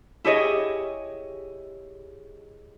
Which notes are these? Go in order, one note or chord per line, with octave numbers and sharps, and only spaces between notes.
E4 G4 G#4 C#5 D#5